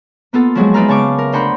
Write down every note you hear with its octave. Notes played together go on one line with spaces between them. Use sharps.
A#3 B3 F4 A4
F3 F#3 G#3 G#4
D#4 B4 D5 E5 F5 A#5
C#3 A5 C#6 D6
A#4
D2 D4 C5 F#5 A#5 B5